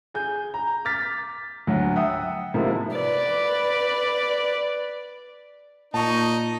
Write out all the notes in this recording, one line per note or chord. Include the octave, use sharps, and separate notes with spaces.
G#4 G#5 G6
A#5
D6 F6 A6 B6
D2 F#3
E5 F#5 G5 D#6
C3 D#3 F3 G#3 A#3 E4
B4 D5
A#2 D#4 A5 C#6